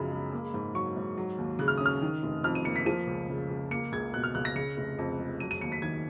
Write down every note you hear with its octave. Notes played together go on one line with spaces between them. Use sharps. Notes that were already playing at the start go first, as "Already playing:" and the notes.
Already playing: B1 F#2 C#3 F3 A#5 B5
G#3
A#3
G#2
F#3 C#6
G#2
F#3
D#2
C#3 F#6
F6
C#4 D#6
F6
D#3
F1
F2 F6
D#7
A#3 C#7
B6
F3 D#7
C#2
C#3
C#2
A#3 C#7
C#2 G#6
B2 F#6
F6
C#2 F#6
A#6
C#3 C#7
F1
F2
G#3
F#3 D#7
D#7
D#2 C#7
B6
D#3 G#6